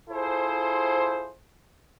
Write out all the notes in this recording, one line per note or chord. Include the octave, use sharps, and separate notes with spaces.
E4 F4 G#4 A4 C5